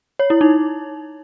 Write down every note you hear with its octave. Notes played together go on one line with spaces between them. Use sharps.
C#5
E4
D#4